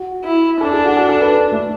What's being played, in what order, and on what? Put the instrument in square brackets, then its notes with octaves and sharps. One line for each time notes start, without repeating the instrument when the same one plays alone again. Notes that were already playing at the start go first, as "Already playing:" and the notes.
Already playing: [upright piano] F#4
[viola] E4
[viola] D4 [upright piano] A4
[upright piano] G#4
F#4
A4
A4
B4
A3